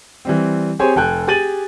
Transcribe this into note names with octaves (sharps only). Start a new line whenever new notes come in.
E3 G3 C4
C4 G4 G#4 C5 C#5 G#5
F1 A4 G5 G#5 F#6
G4 G#4 G#5 A6 D#7 F#7